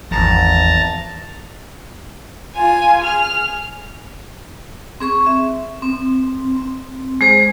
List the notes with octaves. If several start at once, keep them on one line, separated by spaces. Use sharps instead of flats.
G#1 E2 F3 A5 A#5
F4 G#5
G#4 F6
C4 G#4 C#6
E5
C4
C4
G#3 G#4 C5